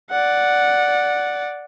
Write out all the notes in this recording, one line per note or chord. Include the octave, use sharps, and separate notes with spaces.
D5 F#5